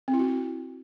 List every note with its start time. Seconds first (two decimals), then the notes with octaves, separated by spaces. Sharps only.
0.08 C4
0.14 E4
0.19 F#4